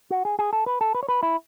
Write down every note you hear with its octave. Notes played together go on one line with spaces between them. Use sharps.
F#4
G#4
G#4
A4
B4
A4
B4
C#5
B4
E4